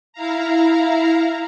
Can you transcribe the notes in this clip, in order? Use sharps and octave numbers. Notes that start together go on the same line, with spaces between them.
E4 F5 A#5